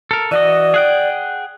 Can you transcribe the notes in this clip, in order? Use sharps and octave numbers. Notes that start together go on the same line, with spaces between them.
A4 A#4
E3 F#4 D5 D#5
G#4 F#5 G5